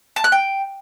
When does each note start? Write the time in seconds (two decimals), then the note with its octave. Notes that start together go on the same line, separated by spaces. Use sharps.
0.16 A5
0.24 F#6
0.32 G5